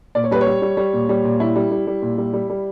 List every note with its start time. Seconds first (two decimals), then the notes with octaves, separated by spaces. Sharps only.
0.15 A#2 D5
0.24 C#5
0.31 G3 B4
0.41 C#5
0.47 G3
0.62 G3
0.77 G3
0.93 A#2
1.09 G3
1.24 A#2
1.40 G3 E4
1.55 G3
1.71 G3
1.87 G3
2.02 A#2
2.18 G3
2.33 G3
2.49 G3